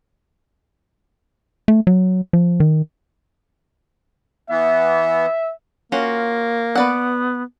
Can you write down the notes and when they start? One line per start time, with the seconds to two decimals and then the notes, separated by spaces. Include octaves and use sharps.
1.68 A3
1.87 F#3
2.33 F3
2.60 D#3
4.50 E3 B3 E5
5.92 A#3 C#4 F4 F#4
6.75 B3 B4 D5 F#5